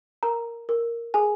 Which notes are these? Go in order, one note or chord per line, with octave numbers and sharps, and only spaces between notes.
A#4 A#5
A#4
G#4 G#5